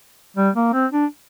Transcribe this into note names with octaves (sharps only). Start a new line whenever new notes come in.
G3
A#3
C4
D4